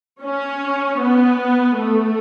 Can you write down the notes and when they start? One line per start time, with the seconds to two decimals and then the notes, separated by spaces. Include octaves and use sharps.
0.22 C#4
1.00 B3
1.78 A3